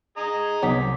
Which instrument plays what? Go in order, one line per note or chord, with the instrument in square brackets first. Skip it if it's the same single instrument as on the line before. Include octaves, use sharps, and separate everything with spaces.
[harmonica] G#4 D#5 A#5
[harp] C2 D6 B6 [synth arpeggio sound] F#3 B3 D#4